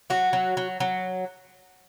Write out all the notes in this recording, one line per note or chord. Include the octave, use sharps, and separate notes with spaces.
F#3 F#4
F#3
F#3
F#3